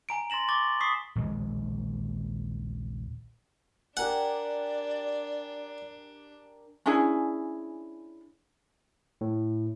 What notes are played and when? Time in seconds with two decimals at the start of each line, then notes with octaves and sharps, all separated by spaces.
0.09 G#5 A#5 D7
0.30 C6 A6 A#6 E7 F#7
0.48 C#6 D6 A6 G7
0.80 C#6 D#6 B6 C7
1.15 A#1 D#2 F3 G#3
3.97 D4 G4 A#4 D5 F#5 G#5
6.86 C#4 D4 E4 G#4
9.21 A2